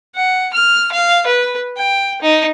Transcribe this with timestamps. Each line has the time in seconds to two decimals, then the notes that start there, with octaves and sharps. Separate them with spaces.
0.15 F#5
0.54 F6
0.92 F5
1.26 B4
1.77 G5
2.22 D#4